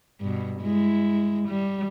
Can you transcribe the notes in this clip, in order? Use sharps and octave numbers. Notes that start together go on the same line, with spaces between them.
G2 B2
G#3 E4
G3